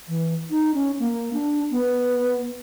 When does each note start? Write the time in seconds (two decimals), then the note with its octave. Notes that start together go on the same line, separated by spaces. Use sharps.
0.08 E3
0.51 D#4
0.74 C#4
0.99 A#3
1.33 D4
1.71 B3